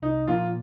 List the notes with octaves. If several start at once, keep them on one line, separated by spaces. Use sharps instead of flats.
C2 D#4
A#2 F3 A#3 F4